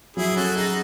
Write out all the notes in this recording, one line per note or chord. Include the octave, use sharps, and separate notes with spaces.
F#3 E4 G#4
C#4 F#4 A4
D#4 F#4 G#4